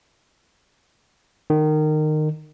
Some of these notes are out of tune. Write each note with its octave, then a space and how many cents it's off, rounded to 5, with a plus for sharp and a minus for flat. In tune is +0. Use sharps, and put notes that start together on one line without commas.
D#3 -20